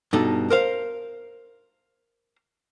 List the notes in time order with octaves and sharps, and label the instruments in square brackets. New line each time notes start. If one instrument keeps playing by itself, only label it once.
[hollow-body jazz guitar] G2 B2 D#4 A4
A#4 C5 F5